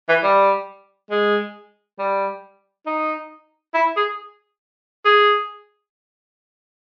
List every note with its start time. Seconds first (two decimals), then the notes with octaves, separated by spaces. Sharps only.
0.09 E3
0.23 G3
1.11 G#3
1.99 G3
2.86 D#4
3.74 E4
3.96 G#4
5.05 G#4